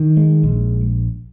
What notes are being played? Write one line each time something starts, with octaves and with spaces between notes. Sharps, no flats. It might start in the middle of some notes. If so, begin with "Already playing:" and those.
Already playing: D#3
G#3
A#1